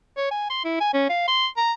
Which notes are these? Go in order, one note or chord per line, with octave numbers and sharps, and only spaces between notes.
C#5
G#5
C6
E4
G#5
C#4
F5
C6
A#5